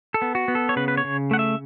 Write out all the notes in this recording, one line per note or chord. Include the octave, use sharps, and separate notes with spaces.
A4
B3
F#4
B3
A4
C#5
C#3 B4
B4
C#5
C#3
A3 F#5
E5